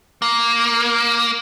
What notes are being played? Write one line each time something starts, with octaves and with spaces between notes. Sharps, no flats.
A#3